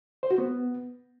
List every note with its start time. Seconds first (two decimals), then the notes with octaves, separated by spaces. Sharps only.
0.23 C5
0.31 F#4
0.38 B3